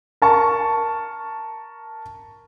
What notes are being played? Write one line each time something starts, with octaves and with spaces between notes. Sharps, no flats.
A#4 A5 C#6